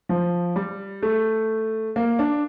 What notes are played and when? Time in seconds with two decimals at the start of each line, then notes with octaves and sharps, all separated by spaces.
0.09 F3
0.56 G3
1.02 A3
1.96 A#3
2.19 D4